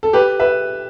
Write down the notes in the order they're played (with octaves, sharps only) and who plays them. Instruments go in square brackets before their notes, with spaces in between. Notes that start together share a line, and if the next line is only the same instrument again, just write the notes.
[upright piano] A4
G4 B4
B4 E5